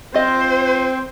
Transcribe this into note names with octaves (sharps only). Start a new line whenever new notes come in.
C4 F4 C5 D#5